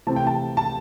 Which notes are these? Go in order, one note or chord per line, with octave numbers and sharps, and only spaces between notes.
C3 E3 A3 C4 A5
G5
A5
A5